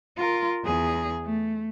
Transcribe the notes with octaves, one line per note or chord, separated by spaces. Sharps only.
F4 A#4
E2 G#4
A3